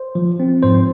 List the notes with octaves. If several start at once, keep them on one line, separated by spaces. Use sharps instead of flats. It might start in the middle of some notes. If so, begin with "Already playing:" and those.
Already playing: C5
F3
C4
G#2 C5